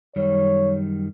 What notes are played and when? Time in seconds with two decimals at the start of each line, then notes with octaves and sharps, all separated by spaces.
0.16 F#2 D#3 G3 C#5